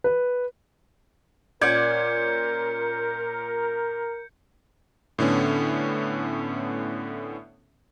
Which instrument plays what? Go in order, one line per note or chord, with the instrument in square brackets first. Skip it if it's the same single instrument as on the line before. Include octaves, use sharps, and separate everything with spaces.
[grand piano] B4
[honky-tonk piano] A#2 C#4 G#6 [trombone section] A#4 [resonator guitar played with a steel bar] D5 F#5 [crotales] G6 C#7
[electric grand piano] A2 D3 B3 C#4